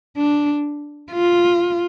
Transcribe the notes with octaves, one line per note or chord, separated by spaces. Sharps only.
D4
F4